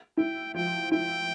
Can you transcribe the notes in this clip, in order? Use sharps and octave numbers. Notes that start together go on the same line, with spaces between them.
E4 G5
F3 G5
E4 G5